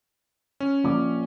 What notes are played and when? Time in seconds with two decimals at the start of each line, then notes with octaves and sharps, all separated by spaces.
0.60 C#4
0.84 A#1 D6